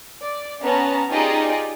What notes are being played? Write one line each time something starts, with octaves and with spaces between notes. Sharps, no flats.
D5
B3 C#4 A5 A#5
D#4 F4 G4 G#4 D5 D#5